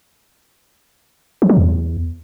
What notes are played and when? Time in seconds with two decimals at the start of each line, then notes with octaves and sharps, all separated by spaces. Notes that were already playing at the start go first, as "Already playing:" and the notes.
1.42 F3
1.49 F#3
1.57 E2